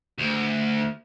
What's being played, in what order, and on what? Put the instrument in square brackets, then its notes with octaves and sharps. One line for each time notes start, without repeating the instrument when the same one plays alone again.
[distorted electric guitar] D2